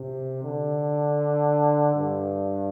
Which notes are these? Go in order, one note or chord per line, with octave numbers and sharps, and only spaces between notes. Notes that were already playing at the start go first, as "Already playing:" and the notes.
Already playing: C3
D3
G2